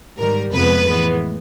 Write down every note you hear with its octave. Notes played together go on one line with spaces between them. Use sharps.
G#2 D#3 G3 A#4
F2 C3 F3 G#3 B3 B4
A2 E3 G#3 B3